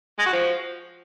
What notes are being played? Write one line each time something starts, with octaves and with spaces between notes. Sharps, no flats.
G#3
F#4
F3